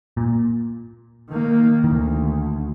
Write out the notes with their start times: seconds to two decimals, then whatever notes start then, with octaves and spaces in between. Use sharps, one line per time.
0.17 A#2
1.30 D#3 A#3
1.84 D2 D#3